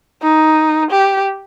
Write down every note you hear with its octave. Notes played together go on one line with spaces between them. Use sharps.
D#4
G4